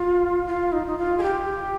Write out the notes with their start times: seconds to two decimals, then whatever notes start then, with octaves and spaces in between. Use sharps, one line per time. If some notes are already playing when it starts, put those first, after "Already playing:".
Already playing: F4
0.47 F4
0.72 D#4
0.86 D#4
0.98 F4
1.18 G#4
1.23 G4